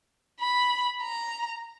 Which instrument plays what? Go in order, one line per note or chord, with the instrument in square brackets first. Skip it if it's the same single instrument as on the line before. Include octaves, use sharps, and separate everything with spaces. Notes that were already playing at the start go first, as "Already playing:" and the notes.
[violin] B5
A#5